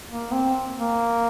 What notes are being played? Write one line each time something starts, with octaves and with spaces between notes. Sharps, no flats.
A#3
C4
A#3